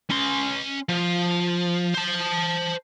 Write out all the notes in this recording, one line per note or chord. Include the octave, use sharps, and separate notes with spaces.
C#4 C6
F3
C5 A5